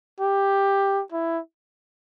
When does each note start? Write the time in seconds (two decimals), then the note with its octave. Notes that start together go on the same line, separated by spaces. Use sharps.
0.20 G4
1.12 E4